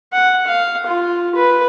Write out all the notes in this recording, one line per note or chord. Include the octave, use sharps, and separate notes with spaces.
F#5
F5
F4
B4